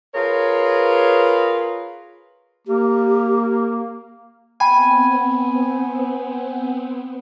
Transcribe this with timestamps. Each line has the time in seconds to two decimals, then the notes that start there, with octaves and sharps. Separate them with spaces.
0.15 F4 G#4 A#4 B4 C#5
2.67 A#3 G4
4.60 B3 C4 G5 G#5 B5